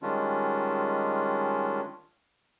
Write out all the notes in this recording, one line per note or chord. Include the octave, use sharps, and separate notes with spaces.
D#3 G3 G#3 C#4 D4 F4